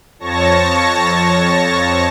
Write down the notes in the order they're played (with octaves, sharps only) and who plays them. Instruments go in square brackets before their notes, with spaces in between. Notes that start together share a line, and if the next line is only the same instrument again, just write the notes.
[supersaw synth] F2 C#5 A5 C#6 A#6